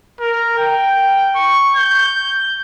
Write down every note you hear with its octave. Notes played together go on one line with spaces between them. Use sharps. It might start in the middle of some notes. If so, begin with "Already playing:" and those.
A#4
G5
C#6
G6